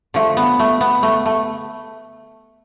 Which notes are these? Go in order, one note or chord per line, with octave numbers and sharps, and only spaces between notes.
D3 F3 A3
B3
A3
B3
A3
A3